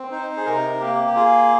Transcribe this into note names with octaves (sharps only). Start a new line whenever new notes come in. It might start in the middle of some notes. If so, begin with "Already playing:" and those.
Already playing: C4
D#4 C5
G#4
C3 A#4
A#3 G4
G4
F4 G#4